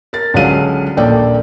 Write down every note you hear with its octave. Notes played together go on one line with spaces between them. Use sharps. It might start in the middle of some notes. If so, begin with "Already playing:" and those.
A#4 A6
C#2 D3 F#3 G#4 F5 D#7
D#1 A#1 A#3 A4 D5 G5